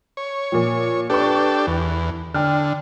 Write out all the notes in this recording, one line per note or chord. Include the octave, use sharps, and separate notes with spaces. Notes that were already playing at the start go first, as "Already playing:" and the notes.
C#5
A#2 F3
D4 G4 A4 B4 C#6
E2
D3 G5 F6